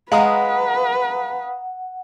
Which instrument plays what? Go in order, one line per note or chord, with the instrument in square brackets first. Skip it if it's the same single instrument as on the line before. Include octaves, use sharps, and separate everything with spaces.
[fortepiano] G#3 [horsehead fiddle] B4 [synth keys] F5 A#5 D#6 [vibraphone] F#5